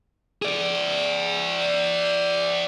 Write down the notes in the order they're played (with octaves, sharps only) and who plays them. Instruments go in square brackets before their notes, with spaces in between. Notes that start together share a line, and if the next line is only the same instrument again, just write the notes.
[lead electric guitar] G#4 D5